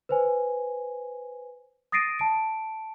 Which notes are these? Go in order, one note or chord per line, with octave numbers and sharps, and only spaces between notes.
B4 C5 G#5
D#6 A6 A#6 C7 D7 D#7
A5 D7